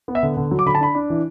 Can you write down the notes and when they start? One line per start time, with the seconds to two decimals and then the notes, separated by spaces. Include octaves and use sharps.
0.08 B3
0.15 E5
0.23 D3
0.37 D3
0.51 F#3
0.59 D6
0.66 D3 B5
0.75 A5
0.80 D4 B5
0.95 D4
1.10 E3